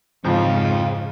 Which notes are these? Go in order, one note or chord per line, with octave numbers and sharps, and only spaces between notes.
F2 G#2 C#3 F3 C4 F4